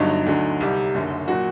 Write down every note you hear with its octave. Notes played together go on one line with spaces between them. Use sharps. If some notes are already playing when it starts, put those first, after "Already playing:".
Already playing: G1 G2 D3 F#3 D#4
D2 D3 F#3
C2 C3 G3
F#1 F#2 D3
A#2 F#3 F#4